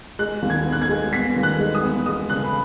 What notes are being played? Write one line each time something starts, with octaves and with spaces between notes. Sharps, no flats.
G#3 F#6
D#2
G#6
B3
F#6
G#6
G#3
B3 B6
D#2
F#6
G#3
D#6
B3
G#3 D#6
C#3 F#6
B5